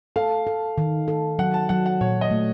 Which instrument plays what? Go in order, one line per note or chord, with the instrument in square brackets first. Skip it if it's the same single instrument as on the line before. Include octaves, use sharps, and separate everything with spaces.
[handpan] A4 [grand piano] F5
[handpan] A4
D#3
A4
[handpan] F#3 [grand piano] F#5
[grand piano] A5
[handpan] F#3 [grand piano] F#5
[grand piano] F#5
[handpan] A#2 [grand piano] C#5
[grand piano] D#5
[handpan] A3